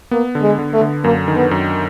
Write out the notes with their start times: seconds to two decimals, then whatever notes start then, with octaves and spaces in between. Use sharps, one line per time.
0.11 A#3 B3
0.35 D3
0.42 G#3
0.59 D3
0.73 A3
0.81 D3
1.04 F#2 A#3
1.28 D#3
1.36 B3
1.51 F#2